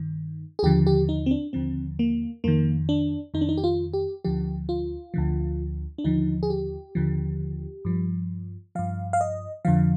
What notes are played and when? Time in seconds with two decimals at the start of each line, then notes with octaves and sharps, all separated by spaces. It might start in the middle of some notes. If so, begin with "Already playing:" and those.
Already playing: G2 D#3
0.59 G#4
0.63 D#2 D3 F3 G4
0.87 G4
1.09 D#4
1.26 C4
1.31 D4
1.53 D#2 D3 F3 C4
1.99 A#3
2.44 F2 D#3 A#3
2.89 D4
3.34 F2 D#3 D#4
3.41 D4
3.49 D#4
3.58 G4
3.64 F4
3.93 G4
4.25 D2 D3 F3 G4
4.69 F4
5.14 D2 D3 F3
5.98 D4
6.04 D#2 D3 F3 D#4
6.43 G#4
6.50 G4
6.95 D#2 D3 F3
7.85 G2 F3
8.75 G2 F3 F5
9.13 F5
9.21 D#5
9.65 F2 D3 F3 F5